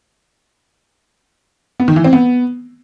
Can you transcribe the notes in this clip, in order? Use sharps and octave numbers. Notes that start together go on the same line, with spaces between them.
B3
D#3
E3
C4
B3